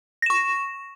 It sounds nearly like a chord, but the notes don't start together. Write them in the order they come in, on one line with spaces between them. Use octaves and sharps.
A#6 E7 C#6